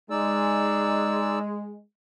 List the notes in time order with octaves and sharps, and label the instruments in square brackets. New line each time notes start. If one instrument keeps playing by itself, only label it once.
[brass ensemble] G#3 [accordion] D#4 D5 E6